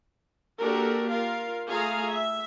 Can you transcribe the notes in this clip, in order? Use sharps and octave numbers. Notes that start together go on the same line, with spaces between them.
A#3 D4 F#4 G4 A4 A#4
F4 A#4 F5
A3 F4 G#4 F5 G#5 A#5
E5